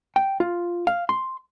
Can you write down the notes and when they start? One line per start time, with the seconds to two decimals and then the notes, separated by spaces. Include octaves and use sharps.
0.16 G5
0.40 F4
0.87 F5
1.09 C6